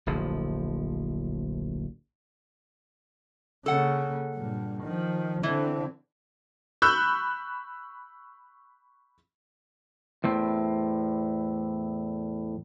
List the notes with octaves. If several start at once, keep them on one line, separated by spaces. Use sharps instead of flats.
D1 A#1 F3
C#3 A#3 A4 F#5
G2 A#2
D#3 F3
D3 E3 C4
B5 C#6 E6 F#6 G6
E2 A2 C4